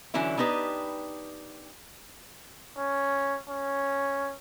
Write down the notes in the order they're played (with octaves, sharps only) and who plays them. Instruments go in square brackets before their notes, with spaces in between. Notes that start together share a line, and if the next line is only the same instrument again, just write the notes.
[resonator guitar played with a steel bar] D3 E3 F#3 C#4 E4
B3 D4 D#4 G4 B4
[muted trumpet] C#4
C#4